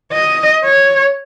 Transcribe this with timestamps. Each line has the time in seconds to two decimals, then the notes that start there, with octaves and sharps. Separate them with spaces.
0.12 D#5
0.64 C#5